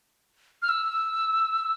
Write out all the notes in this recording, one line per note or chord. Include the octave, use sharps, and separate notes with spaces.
F6
E6